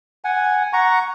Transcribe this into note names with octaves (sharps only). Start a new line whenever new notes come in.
F#5 G#5
F#5 A#5 C#6